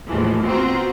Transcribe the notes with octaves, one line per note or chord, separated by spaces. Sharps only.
D#2 A2 E3 F3 G#3
B3 C4 F4 F#4 C5 A#5